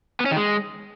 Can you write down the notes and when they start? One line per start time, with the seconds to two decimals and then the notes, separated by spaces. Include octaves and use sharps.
0.20 B3
0.26 C#4
0.31 D#3
0.37 G#3